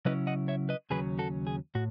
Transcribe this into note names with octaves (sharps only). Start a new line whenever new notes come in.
C#3 F#3 C#4 E4 B4 D#5
D#5 F#5
C#5 E5
B4 D#5
D#2 C#3 F#3 C#4 G#4 B4
F#4 A4
G#4
A2 F#4